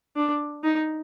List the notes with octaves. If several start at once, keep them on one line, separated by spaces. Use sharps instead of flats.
D4
D#4